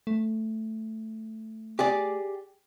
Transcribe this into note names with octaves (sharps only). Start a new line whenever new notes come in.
A3
G4 G#4 D5